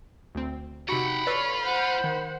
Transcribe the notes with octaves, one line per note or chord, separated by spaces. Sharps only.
D2 C4
C3 D#4 F#4 F#5 G5 B5
F4 A4 B4 C#5 D5
C5 F#5
D#3